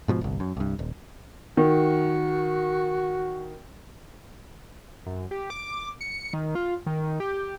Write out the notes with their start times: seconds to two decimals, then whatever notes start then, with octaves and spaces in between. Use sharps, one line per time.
0.08 G#2 B2 F3
0.21 G1 C2
0.40 F#2
0.57 C2 G2
0.79 D#1
1.57 D#3 F#4
5.06 F#2
5.31 G4
5.50 D6
6.01 C#7
6.33 D#3
6.55 F4
6.86 D#3
7.20 G4